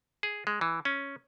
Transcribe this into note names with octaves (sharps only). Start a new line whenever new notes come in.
G#4
G#3
E3
C#4